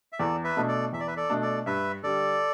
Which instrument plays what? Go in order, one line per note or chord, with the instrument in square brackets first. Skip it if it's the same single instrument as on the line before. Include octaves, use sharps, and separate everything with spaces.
[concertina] E5
[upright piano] E2 [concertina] A4 D5
[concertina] B4 E5
[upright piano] B2 A3 D4
[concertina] A4 D5
[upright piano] E2 [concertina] E5
[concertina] D5
B4 E5
A4 D5
[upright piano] B2 A3 D4
[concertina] A4 D5
[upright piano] G2 [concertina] B4 E5
[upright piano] D3 G3 [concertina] A4 D5